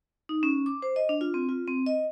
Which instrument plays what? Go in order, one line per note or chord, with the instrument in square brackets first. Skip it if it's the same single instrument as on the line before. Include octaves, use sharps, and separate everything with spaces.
[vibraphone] D#4
C#4
D6
C5
D#5
D4
F4
C4
F4
C4
D#5